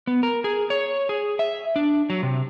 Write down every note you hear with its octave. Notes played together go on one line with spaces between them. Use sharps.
B3
A#4
G#4
C#5
G#4
E5
D4
F#3
C3